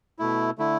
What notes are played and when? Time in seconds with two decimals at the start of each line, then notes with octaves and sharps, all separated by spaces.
0.19 B2 A3 E4
0.58 D3 A3 E4